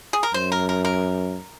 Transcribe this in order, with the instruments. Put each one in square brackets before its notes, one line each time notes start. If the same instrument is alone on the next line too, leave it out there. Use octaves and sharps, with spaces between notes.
[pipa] G#4
A#4
[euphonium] F#2 [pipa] C5
[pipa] A#4
A#4
A#4